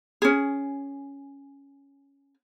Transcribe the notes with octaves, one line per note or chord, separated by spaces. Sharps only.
C#4 G#4